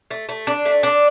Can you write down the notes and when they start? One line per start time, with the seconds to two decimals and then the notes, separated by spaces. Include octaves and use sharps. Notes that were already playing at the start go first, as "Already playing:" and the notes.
0.11 A3
0.29 A3
0.47 D4
0.65 A3
0.83 D4